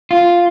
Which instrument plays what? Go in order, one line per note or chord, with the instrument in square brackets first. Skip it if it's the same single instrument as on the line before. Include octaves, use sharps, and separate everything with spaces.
[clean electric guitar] F4